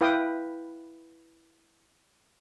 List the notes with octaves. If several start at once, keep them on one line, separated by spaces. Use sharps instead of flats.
E4 B4 F5 G5 D#6